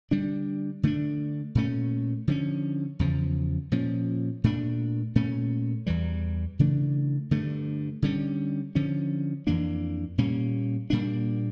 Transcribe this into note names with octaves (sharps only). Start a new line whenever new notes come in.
D3 G3 D4
D3 A3 D4
A#2 A3 C#4
D3 F3 A3 C#4
E2 C#3 F3
A#2 F3 C#4
A#2 A3 D4
A#2 A3 C#4
E2 E3 G3
C#3 E3 A3 D4
G2 D3 A3
D3 G3 C#4
D3 F3 C#4
F2 E3 A#3 D4
A#2 G3 A#3 C#4
A#2 G3 A#3 D4